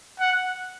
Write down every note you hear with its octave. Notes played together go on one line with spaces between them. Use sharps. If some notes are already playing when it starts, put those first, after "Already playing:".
F#5